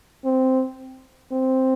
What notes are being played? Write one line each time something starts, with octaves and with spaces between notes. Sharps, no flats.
C4
C4